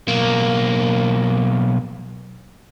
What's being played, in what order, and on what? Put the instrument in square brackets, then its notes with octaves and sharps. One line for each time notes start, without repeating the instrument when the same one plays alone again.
[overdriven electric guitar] B1 A#3